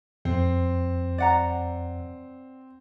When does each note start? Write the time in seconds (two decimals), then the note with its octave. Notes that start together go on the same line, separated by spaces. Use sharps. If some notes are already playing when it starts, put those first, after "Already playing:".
0.25 F2 C4
1.18 D5 F#5 A#5